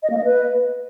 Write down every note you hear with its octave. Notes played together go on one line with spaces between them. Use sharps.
D#5
A#3
D#5
B4